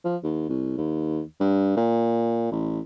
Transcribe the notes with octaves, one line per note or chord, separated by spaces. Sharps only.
F3
D#2
C2
D#2
G2
A#2
A1